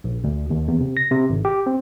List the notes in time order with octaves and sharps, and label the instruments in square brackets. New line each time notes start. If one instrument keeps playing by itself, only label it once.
[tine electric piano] A#1
D2
D#2
E2
C3
A#6
C3
G#1
G4
C4